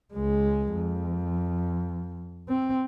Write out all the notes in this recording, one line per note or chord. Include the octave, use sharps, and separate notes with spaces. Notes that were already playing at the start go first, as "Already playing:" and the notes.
C#2 G#3
F2
C4